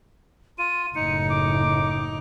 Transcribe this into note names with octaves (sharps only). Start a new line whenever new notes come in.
F4 D#7
F#1 A2 D#4 C#7
D6